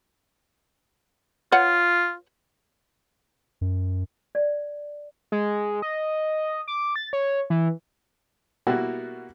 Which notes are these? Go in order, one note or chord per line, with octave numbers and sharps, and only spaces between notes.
F4 B4 C#5 F#5
F#2
D5
G#3
D#5
D6
A6
C#5
E3
B2 G3 A#3 E4 F#4